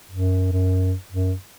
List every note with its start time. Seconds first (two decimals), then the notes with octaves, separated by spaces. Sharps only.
0.11 F#2
0.52 F#2
1.12 F#2